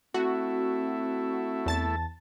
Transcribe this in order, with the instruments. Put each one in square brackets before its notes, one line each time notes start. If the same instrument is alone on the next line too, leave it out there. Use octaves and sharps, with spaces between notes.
[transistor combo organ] A3 E4 [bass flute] C4 [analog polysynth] F#4
[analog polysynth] E2 A5 A6